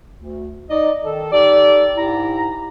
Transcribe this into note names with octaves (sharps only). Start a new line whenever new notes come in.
D2
D#4 D5 D#5
D#3 A4
D#4 G4 A4 D5
G#2 E4 G4 A#5